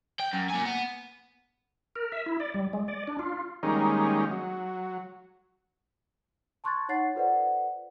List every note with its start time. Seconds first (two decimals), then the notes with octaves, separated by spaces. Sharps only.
0.20 G5
0.33 F#2
0.50 A#3 G#5
0.65 B3
1.96 A#4
2.12 E5
2.26 E4
2.40 D5
2.54 G3
2.73 G#3
2.88 D5
3.07 D4
3.19 F4
3.63 D#3 G3 G#3 A#3 C#4 D#4
4.30 F#3
6.64 A5 C6 C#6 F#6 G#6 A6
6.89 D#4 C#5 F#5 A6 C7
7.15 F4 A4 B4 C5 D5 F#5